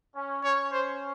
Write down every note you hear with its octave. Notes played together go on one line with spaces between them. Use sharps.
C#4
C#4 C#5
C5